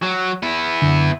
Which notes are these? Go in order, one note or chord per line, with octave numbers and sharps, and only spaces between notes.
F#3
B3 E4
F#2 D3